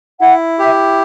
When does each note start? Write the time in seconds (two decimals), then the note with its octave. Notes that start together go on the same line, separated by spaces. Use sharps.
0.20 E4 F#5
0.58 G4 E5